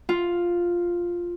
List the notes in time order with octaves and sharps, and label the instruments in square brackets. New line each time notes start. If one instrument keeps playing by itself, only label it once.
[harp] F4